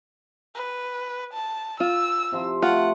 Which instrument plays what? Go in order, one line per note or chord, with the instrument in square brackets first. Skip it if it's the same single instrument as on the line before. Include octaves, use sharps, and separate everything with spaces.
[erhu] B4
A5
[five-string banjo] F4 [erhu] E6
[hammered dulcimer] C3 F3 C6
[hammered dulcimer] A3 [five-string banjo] F4 [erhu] F#5